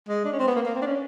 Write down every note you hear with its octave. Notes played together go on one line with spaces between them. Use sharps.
G#3
D4
C#4
C4
B3
A#3
A#3
C4
D4
C#4